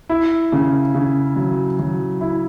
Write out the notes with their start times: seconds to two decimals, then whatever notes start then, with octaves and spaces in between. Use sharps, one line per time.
0.09 E4
0.52 C#3
0.94 C#3
1.36 F#3
1.79 F#3
2.21 E4